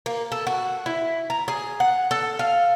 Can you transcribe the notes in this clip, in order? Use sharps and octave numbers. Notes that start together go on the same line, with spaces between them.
A#3
A4
F#4
E4
A#5
G#4
F#5
A4
F5